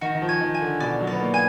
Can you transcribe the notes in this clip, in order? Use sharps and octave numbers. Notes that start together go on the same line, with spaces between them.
D#3 F#4
D#3
F3
G#5
D#3
G#5
D3
B2 D5
F#3
D5
B3
A#3
G#5